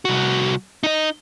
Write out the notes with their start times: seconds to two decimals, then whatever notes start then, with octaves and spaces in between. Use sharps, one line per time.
0.05 C2 F#4
0.83 D#4 D#5